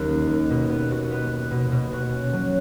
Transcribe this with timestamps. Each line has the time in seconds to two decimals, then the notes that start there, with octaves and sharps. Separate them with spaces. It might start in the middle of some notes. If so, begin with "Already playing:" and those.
Already playing: D#2 F#3 C#4
0.08 D#3
0.29 D#2
0.50 B2
0.70 B3
0.91 F#4
1.11 B3
1.32 B3
1.51 B2
1.72 B2
1.93 F#4
2.13 C#4
2.33 F#3